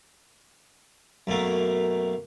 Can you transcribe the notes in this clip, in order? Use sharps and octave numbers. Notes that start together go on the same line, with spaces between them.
F#2 B2 A3 A#3